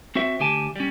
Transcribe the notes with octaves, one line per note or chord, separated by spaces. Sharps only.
C4 F#4 C5 E5
D2 G4 G#5 A5
G3 C#4